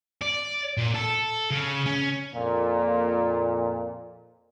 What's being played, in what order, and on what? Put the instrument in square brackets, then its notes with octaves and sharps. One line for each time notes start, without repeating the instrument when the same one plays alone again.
[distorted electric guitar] D5
A#2
A4
C#3
C#4
[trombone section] F2 A#2